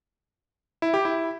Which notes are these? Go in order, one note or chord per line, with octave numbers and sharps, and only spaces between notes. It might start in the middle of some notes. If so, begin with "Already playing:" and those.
E4
G4
E4